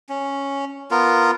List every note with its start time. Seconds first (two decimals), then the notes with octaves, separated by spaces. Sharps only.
0.09 C#4
0.91 B3 F4 A#4